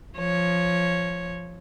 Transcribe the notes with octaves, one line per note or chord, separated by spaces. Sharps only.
F3 C#5